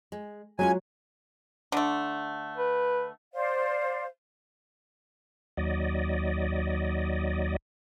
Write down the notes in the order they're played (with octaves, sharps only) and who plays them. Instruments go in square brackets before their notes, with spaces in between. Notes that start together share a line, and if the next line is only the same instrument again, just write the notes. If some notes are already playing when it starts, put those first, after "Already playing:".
[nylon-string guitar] G#3
[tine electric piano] F#3 [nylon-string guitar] G#3 C#4 F4 [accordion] G#5
[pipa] D3 A3
[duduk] B4
[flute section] C5 D5 F5
[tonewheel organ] D#2 F#3 D5 D#5